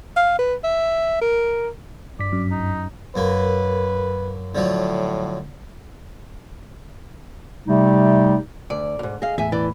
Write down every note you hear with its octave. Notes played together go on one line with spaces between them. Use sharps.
F5
B4
E5
A#4
G2 D5 B6
F#2
D#4
F#2 A#3 B4
A2 D3 F3 F#3
C3 G3 A3 D#4
D2 D5
F2 G#2
G#4 D#5 F5
E2 A2 E5 G#5
E3 D5